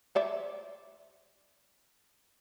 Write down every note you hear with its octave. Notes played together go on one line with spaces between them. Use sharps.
C5 D5 E5